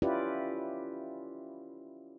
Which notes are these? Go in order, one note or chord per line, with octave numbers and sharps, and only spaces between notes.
C#4 E4 F4 G4 B4 D5